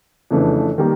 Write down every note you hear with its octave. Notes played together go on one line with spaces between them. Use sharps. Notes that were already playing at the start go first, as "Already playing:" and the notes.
F2 C#3 E3 A3 D4
D#3 G3 A#3